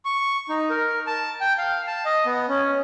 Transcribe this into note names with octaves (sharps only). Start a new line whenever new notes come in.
C#6
D#4
A#4
A5
G5
F5
A5
D#5
B3
C#4